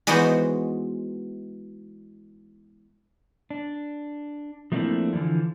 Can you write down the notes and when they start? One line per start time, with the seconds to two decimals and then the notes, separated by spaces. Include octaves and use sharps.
0.07 E3 G#3 B3 D#4 F#4 C5
3.51 D4
4.72 F3 A3 A#3 C4 D4 E4
5.13 D3 E3 F3 G#3